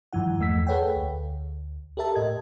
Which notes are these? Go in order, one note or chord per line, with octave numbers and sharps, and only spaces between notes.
G2 D#3 F3 E4 F#5
E2 A3 E6 B6
G#4 A4 B4 C#5 F#5 G5
D2
G4 A4 A#4 E5 A5
A2 D#5 G#6